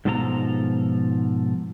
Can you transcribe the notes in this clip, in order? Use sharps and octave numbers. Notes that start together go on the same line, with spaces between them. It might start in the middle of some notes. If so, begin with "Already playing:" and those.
G#2 B2 F3 A4 A5 A#5